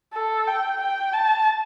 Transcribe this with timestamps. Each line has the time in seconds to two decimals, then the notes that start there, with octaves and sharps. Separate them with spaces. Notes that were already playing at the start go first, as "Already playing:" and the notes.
0.14 A4
0.47 G5
0.81 G5
1.13 A5